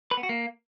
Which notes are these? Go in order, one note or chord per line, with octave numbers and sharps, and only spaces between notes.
B4
B3
F#4
A#3